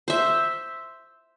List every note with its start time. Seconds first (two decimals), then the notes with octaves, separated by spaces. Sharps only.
0.08 C5 E5